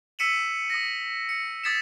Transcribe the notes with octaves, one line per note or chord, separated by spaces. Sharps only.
E6 B6 C#7 D#7 E7 F#7
D#6 A#6
C#7
D#6 G#6 A6 B6 C#7 E7